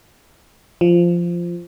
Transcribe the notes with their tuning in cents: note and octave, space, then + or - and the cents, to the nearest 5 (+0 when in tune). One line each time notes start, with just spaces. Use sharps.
F3 -10